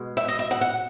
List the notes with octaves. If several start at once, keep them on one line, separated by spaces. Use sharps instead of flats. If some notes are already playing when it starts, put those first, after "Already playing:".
Already playing: B2 G#3
E5
D#5
E5
F#5
F#5